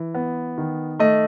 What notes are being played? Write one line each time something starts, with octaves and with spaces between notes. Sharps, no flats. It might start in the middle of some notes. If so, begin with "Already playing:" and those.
Already playing: E3
B3
D#3
A3 D#5